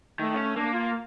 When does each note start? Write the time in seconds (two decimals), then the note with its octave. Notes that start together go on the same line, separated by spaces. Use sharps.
0.19 D#3 A3
0.34 C#4
0.56 A#3 D4
0.73 F4